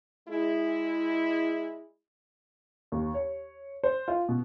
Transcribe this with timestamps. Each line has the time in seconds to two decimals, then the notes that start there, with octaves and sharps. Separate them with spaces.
0.29 G#3 E4
2.92 D#2
3.14 C#5
3.83 C5
4.08 F4
4.29 B2